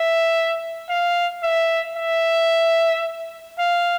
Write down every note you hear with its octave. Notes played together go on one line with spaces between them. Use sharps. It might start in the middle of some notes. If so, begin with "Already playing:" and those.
Already playing: E5
F5
E5
E5
F5